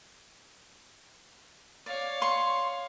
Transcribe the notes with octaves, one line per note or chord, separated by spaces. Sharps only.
C#5 D5 F5
C6 C#6